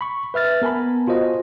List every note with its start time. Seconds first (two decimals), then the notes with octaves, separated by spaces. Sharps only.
0.01 B5 C#6
0.34 B4 E5 F6 A6
0.62 B3 A#4 G#5 A5 B5
1.07 F4 F#4 C5 D#5